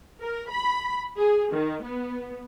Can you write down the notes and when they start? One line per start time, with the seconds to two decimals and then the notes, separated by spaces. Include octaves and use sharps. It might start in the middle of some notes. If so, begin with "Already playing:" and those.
0.22 A#4
0.50 B5
1.18 G#4
1.53 D#3
1.83 B3